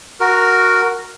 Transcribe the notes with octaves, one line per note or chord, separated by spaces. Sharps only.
F#4 A#4